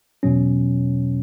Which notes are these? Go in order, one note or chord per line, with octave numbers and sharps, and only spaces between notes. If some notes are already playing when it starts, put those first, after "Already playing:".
E2 B2 F#3 C#4